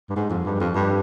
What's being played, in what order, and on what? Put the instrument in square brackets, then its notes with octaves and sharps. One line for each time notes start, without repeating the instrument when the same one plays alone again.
[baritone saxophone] G2
G#2
F2
G2
F2
G2